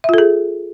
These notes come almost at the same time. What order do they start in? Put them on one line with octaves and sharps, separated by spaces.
E5 F4 A4 G#4